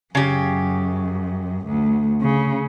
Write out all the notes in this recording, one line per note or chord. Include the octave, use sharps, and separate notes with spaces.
F#2 C#3 G4
D2
C#3